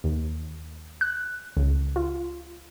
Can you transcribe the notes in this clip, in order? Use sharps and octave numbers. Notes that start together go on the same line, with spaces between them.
D#2
F#6
C#2
F4